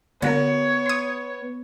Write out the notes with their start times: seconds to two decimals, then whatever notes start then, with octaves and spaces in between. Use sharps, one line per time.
0.22 D3 B3 F#4 A#4 C#5
0.86 C6 D#6